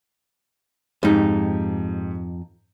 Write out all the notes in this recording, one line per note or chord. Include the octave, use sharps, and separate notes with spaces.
F2 G#2 D#4 G4